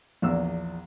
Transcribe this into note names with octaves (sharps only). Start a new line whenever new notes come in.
A#1 E2 E6